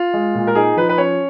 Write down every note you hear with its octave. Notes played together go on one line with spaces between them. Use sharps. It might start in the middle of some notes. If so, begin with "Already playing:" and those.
Already playing: F4
G#3
A#2
A#4
D#4 G#4
F3 B4
B4
C#4 C#5